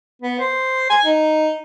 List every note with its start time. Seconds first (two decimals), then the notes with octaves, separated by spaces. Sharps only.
0.22 B3
0.39 C5
0.90 G#5
1.05 D#4